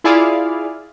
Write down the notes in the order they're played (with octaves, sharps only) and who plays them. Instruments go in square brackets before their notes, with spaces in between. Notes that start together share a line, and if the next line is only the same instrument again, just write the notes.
[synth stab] E4 F4 G#4 D5 F5